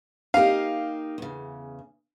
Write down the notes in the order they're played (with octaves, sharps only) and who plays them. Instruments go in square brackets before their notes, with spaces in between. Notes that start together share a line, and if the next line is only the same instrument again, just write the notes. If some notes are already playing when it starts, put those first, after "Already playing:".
[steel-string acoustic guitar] A#3 D#4 G4 [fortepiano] F5
[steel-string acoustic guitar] E2 C#3